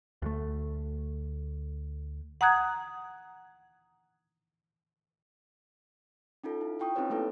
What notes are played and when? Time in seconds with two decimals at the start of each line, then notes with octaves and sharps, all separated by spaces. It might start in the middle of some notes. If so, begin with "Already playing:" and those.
0.22 D2 A3
2.41 F#5 A#5 D#6 F#6 G#6
6.44 C#4 D#4 F4 A4
6.61 E4
6.79 E4 F4 G5 C#6 D#6
6.95 C4 C#4 D#4 G4 B4 C#5
7.10 A3 A#3 E4 A4 B4